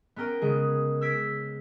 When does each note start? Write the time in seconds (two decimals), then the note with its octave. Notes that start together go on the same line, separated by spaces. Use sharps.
0.16 B3 C#4 A#4 G5
0.41 C#3 G#3 G#4
1.01 E6 G6 G#6 B6 D7